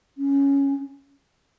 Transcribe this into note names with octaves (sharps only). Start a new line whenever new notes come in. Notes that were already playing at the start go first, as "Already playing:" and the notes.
C#4